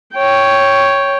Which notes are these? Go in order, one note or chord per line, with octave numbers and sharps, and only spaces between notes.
C#5 G5